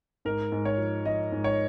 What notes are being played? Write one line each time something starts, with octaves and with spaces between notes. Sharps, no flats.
G#2 A#4
G#2
C#5
F3
F3 D#5
G#2
C#5